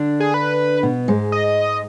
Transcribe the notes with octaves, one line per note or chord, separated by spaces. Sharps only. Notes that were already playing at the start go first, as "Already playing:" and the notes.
Already playing: D3 D4
G#4
B4
B2 B3
G#2 G#3
D#5